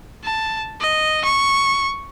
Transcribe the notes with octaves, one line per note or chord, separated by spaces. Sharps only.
A5
D#5
C#6